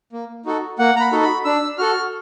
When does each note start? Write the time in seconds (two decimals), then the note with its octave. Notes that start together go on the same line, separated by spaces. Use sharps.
0.13 A#3
0.45 D#4 F#4 A4
0.79 A#3 F#5
0.96 A#5
1.01 B5
1.12 D#4 F#4 A4
1.23 B5
1.45 D4 E6
1.78 F#4 A4 F6